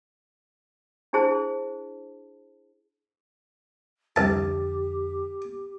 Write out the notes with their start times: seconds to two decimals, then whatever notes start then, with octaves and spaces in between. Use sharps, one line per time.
1.13 D4 E4 G#4 C5 A5
4.16 C2 F2 D3 G4 A5